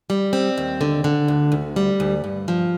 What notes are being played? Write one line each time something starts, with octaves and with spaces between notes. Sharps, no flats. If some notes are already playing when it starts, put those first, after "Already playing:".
G3
C4
D#2
D3
D3
D2
D2
G3
D2
G2
F3